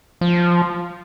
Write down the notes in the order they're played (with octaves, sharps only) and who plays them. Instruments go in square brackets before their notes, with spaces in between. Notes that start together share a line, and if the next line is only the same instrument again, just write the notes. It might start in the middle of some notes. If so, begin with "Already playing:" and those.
[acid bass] F3